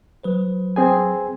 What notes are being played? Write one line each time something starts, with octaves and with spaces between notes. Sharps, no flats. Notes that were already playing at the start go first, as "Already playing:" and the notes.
F#3 B4 C5
C4 G#4 G#5